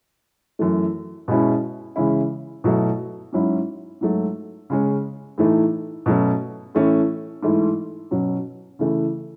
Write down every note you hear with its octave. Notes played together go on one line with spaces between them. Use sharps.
F#2 E3 A3
B2 G#3 C#4 E4
C#3 E3 G#3 C#4 E4
B2 F#3 A3 E4
G#2 F#3 C#4 E4
G#2 F#3 A3
C#3 G#3 C#4
A2 E3 A3 D#4
B2 F#3 A3 C#4
A2 E3 A3 C#4
G#2 E3 A3 E4
B2 F#3 C#4
C#3 E3 A3